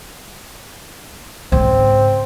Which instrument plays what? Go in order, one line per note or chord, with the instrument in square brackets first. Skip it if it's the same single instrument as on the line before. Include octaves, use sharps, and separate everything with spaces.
[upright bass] G#2 C#3 [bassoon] C4